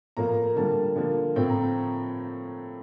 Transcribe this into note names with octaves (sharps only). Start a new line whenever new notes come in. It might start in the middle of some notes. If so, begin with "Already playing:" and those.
A2 F3 A#3 A#5
D3 G3 A#3 A5
D3 F3 A#3
A2 F3 C4 G5
A#5